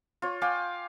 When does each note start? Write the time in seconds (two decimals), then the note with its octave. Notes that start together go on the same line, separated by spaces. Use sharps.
0.22 F4 C#5
0.41 F5 G5 G#5 D6